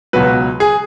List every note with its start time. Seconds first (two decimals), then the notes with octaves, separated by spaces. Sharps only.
0.13 C#2 B2 F#3 B4
0.60 G#4